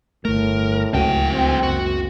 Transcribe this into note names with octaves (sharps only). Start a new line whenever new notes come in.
G1 A2 A3 A#4
D1 C#2 D3 F#4 G5 D#7
C4
F#1 F#4